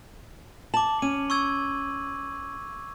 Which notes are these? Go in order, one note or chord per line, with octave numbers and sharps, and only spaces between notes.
A5 D6 F#7
C#4 D#7
C#6 E6 G#6